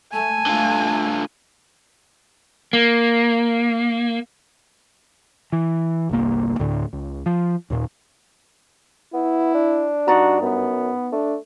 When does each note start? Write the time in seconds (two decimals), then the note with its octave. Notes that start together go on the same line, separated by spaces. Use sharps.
0.13 A3 G#5 A5
0.46 D3 A3 F4
2.73 A#3
5.52 E3
6.09 G1 C2 A#3
6.59 D2 A2 D3
6.93 C#2
7.26 F3
7.70 D#2 A#2
9.14 B3 E4
9.55 D4
10.08 G2 D#4 F#4 D5 A#5
10.42 F#2 B3
11.12 A3 D4